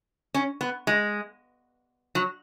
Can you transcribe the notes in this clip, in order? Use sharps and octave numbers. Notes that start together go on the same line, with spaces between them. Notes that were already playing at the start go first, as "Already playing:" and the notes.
C#4
B3
G#3
F#3